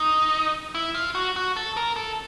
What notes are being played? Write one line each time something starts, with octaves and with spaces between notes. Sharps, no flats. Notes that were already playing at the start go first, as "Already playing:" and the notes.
Already playing: D#4
E4
F4
F#4
F#4
A4
A#4
A4